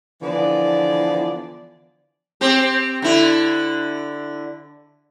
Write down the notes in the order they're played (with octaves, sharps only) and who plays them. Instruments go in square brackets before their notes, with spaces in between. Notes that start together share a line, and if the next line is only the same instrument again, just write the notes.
[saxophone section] D3 E3 F3 B3 D5
[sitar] C4 G4
D3 E4